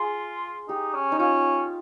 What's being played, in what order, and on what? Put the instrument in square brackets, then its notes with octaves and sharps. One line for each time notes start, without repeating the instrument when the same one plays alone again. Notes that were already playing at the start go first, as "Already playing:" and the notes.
Already playing: [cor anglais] F4 [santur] G#4
[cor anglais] D#4 [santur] G4
[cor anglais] C#4
[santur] D#4
[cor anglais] C#4 [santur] F4